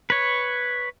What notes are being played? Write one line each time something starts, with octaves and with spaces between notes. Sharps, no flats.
B4 C#5